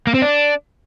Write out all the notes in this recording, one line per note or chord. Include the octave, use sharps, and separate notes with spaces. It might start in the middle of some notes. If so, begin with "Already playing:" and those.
A#3
C4
D4